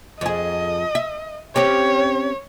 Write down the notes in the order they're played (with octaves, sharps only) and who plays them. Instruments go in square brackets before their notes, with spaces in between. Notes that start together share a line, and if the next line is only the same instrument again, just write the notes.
[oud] F2 G#4 [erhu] D#5
[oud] E5
[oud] C4 C#4 G4 [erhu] C#5